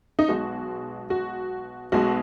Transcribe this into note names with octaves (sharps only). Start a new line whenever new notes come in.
D#4
B1 B2 G#3 F#4
F#4
B1 B2 G#3 F#4